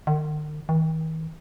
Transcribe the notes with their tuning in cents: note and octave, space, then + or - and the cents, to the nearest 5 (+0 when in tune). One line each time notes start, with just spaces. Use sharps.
D#3 -45
D#3 +45